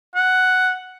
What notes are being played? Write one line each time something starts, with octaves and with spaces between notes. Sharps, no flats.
F#5